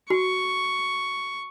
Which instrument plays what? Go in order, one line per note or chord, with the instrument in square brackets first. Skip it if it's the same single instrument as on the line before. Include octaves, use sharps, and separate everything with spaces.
[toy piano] F#4 [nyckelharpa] C#6